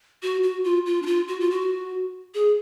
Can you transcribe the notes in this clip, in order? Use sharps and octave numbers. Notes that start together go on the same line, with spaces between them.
F#4
F#4
F4
F4
D4
F4
F#4
F4
F#4
G#4